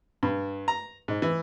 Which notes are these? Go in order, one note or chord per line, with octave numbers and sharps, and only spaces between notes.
G2
A#5
G#2
E3